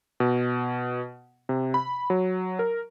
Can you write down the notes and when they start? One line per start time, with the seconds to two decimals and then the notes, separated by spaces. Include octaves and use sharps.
0.20 B2
1.49 C3
1.74 B5
2.10 F#3
2.59 A#4